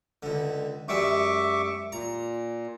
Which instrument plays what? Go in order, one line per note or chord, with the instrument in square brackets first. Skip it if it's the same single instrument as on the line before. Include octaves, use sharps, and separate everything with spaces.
[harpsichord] C#2 D3
[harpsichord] F#2 G3 G#3 [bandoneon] E5 C#6 D6
[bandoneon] A#2 [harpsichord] A#5